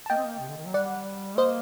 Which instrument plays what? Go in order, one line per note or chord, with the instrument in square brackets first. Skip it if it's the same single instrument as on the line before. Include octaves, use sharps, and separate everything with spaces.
[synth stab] A5
[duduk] A#3 [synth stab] D#5 G5
[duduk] C4
A#3
C3
D3
D#3
F#3
[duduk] G3 [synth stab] D5 F#5
[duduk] A#3 [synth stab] C5 D#5